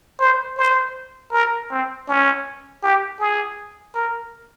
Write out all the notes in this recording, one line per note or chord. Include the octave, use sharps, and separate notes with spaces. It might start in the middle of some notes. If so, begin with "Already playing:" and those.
C5
C5
A#4
C4
C#4
G4
G#4
A#4